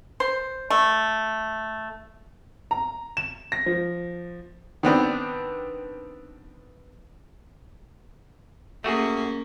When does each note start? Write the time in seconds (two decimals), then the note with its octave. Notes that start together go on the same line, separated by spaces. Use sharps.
0.20 C5
0.70 A3
2.71 A#5
3.17 E7
3.52 A#6
3.66 F3
4.83 D#3 B3 C4 D4
8.84 A3 A#3 C#4 F#4 G#4